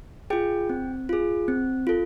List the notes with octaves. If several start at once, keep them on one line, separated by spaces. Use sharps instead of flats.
F4 G#4 G5
C4
F4 G#4
C4
F4 A4